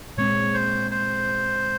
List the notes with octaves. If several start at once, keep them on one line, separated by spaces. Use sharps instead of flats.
A#2 G#3 C4 C#5
C5
C5